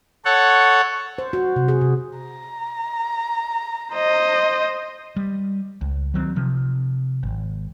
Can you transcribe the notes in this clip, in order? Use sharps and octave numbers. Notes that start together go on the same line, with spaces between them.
A4 C#5 F#5
C5
F#4
C3
G#4
C3
A#5
C5 D#5
G3
C#2
D#3 F#3 A3 C4
C3 F3
G#1